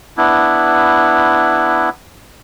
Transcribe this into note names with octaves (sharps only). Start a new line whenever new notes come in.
B3 D4 E4